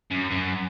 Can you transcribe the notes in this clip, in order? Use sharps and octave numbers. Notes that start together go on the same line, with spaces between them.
F#2
F#2